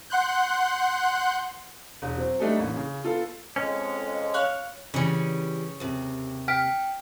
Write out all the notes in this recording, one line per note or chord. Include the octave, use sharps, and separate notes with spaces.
F#5 C6 F#6 G6
E1
F#3 C4
G3 A3 D4 D#4 G4 A4
A1 A#3
C#3
B3 F4 A4
F2 G#3 C#4
C#5 F5 F#6
C#3 E3 G3 C#4
D#2 C3
G5 F6 B6 D7